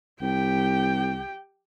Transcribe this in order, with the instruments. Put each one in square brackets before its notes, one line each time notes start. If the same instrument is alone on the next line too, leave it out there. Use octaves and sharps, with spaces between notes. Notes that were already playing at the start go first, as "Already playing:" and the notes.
[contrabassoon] C2 [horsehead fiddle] G4 G5